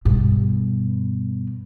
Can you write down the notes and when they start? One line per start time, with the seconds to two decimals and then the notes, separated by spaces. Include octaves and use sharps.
0.05 G2 B2